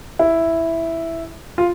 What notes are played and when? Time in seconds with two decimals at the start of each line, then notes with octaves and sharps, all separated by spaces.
0.19 E4
1.58 F4